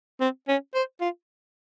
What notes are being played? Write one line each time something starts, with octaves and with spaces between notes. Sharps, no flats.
C4
C#4
C5
F4